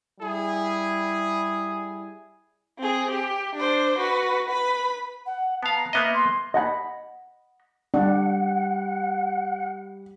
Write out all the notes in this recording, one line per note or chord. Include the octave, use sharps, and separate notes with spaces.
G3 E4 G#4
C4 G#4
G4
D4 C5
F#4 B4
B4 B5
F#5
B3 F5 A5
A#5
A#3 B3 D#5 E5
C6
D#5 F#5 G#5 B5
G3 D4 F#5